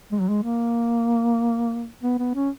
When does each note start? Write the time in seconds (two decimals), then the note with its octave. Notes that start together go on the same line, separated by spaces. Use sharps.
0.12 G#3
0.21 F#3
0.28 G#3
0.43 A#3
2.03 B3
2.19 B3
2.35 C#4